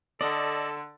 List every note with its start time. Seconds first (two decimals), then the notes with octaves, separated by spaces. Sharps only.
0.21 D3 A4 D5 D#5